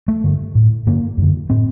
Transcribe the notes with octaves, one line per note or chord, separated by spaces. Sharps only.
A3
G2 D3
A2
G2 D3 A#3
F#2 D3
A2 C4